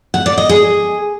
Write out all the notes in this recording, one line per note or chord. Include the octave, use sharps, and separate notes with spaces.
F#5
D5
D#5
G#4